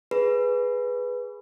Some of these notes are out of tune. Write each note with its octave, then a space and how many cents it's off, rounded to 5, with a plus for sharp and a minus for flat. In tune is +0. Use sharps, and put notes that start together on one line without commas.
G#4 +0 B4 +0